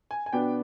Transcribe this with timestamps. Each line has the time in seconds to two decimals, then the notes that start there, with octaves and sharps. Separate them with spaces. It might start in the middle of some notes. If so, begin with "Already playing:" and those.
0.11 G#5
0.26 G#5
0.33 B2 B3 D4 G5